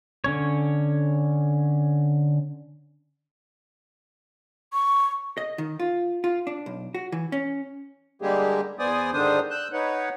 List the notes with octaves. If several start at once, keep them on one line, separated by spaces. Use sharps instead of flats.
D3 C#4 C#5
C#6
D#5
D#3
F4
F4
D4
B1
F#4
E3
C#4
D3 G3 G#3 A#3 G4 G#4
E2 B3 C5 D5 G#5 D#6
G#2 D3 D#3 D4 C5 D#6
E6 F#6 G6
D#4 B4 C#5 F#5